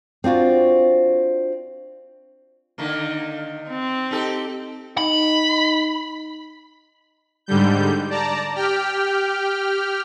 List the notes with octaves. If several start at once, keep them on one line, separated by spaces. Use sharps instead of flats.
C4 D4 F4 F#4
D3 D#3 A#3
C4
D#4 G4 A4
D#4 B5
G#2 D3 G3 G6
D5 A5 A#5
G4 G5 F6